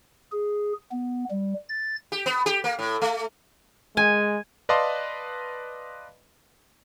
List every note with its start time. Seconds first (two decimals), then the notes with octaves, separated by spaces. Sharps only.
0.32 G#4
0.92 B3
1.30 G3
1.69 A6
2.12 G4
2.26 B3
2.46 G4
2.64 A#3
2.79 A2
3.01 A3
3.97 G#3 G#5
4.69 B4 D5 D#5 F5 A5 C6